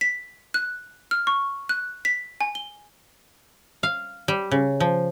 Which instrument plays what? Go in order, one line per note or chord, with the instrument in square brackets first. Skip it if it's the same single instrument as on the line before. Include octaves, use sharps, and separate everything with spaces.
[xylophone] B6
F#6
F6
C#6
F#6
B6
G#5
G7
[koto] F5
G3
C#3
F3